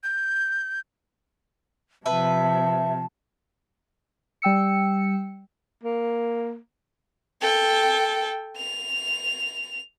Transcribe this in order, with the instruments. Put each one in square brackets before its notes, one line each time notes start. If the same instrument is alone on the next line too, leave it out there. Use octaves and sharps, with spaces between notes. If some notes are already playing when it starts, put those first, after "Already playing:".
[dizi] G6
[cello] C3 F3 [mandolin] B4 E5 [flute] A5
[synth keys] G3 G5 E6 C#7
[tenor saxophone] A#3
[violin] A4 G5
F7